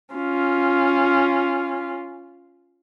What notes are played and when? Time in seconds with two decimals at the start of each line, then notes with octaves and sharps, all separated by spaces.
0.15 C#4 F4